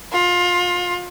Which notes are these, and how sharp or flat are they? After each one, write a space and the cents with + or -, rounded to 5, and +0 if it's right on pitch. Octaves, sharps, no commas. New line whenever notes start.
F4 +25